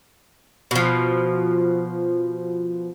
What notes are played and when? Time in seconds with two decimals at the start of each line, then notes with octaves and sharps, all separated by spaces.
0.71 B2 F3